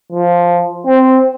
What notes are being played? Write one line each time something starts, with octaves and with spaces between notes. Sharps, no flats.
F3
C4